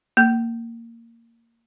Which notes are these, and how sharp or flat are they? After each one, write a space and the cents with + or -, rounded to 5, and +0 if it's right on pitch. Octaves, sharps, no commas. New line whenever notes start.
A#3 -15